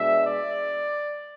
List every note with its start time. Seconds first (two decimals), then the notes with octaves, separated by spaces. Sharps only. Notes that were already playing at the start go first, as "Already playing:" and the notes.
Already playing: B2 G#3 D4 E5
0.25 D5